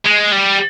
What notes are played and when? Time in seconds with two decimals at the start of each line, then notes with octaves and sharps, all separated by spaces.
0.06 G#3
0.33 G3